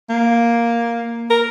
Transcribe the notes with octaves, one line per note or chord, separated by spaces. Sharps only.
A#3
A#4